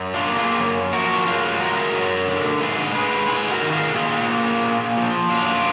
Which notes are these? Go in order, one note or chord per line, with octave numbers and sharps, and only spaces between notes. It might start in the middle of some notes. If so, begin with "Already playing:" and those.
Already playing: F#2
D4 F4
A#3
F4 G#4
F#2
F3 F#4 A#4
F#2 F4 G#4
G#3 F#4 A#4
F#2
D3
G#2 G#4 B4
G#3 G#4 B4
G#2 G#4 B4
F#4 A#4
D#3
F4 G#4
A#2 F4 G#4
A#3
A#2
F3
F#2 D4 F4